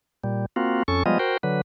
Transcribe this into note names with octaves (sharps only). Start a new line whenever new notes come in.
A#2 G3
A#3 C4 F4 F#4
F2 C#4 A4 C#6
F3 G3 G#3 B3 F4 D#5
F#4 A#4 C5 G5
D3 F#3 B4